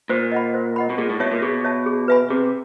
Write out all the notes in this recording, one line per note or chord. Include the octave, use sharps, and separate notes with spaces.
A#2 C5
D#5 F#5 B5
C5
D#5 F#5 B5
B2
A#2 G#4
A2
B2 C#5 E5 A5
A#2
B2 G#4
C#5 E5 A5
G#4
B4 E5 G#5 B5
C3 G#4